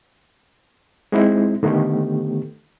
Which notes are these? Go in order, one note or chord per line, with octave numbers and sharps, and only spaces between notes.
G#3 C4 D#4 E4
D3 D#3 A3 B3 G4